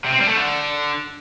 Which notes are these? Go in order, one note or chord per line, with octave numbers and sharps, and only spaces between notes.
C3
C4
G3
A3
D3